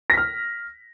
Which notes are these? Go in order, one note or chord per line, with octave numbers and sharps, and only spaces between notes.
F6 A#6 B6